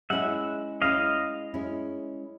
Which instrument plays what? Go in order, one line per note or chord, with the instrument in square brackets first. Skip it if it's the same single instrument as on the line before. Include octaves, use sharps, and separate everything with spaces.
[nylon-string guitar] G#3 C#4 E4 [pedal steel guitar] E5 F#5
[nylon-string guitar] G#3 C#4 E4 [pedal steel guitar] D#5 F5
[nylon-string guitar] G#3 C#4 E4